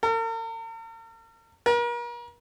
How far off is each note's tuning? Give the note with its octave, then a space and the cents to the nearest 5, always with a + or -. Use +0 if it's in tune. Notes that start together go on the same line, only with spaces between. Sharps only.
A#4 -45
A#4 +40